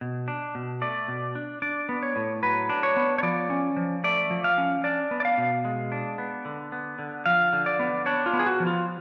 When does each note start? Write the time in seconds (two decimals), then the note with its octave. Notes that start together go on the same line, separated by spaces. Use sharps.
0.01 B2
0.28 D4
0.55 B2
0.82 A3 D5
1.08 B2
1.35 D4
1.62 D4 D5
1.89 B3
2.03 C#5
2.16 A2
2.43 F#3 B4
2.69 D4
2.83 C#5
2.96 B3
3.18 C#5
3.23 F3 D5
3.50 C#4
3.76 F3
4.04 A3 D5
4.31 F3
4.44 F5
4.58 C#4
4.84 D4 D5
5.11 B3
5.20 D5
5.25 F5
5.38 B2
5.65 G#3
5.92 D4
6.18 B3
6.45 D3
6.72 B3
6.99 D3
7.26 F3 F5
7.53 D3
7.66 D5
7.79 B3
8.06 D4 C#5
8.26 F4
8.33 B3
8.39 G#4
8.46 F#4
8.60 F3
8.67 F4